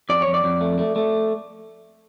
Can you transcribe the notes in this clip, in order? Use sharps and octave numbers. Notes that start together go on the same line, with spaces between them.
F2 D5
C#5
F2
D5
F2
A3
A3
A3